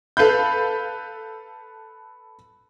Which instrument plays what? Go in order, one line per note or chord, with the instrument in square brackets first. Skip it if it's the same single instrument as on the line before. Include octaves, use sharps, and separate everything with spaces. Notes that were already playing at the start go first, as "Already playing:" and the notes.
[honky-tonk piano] A4 B4 F5 B5 G6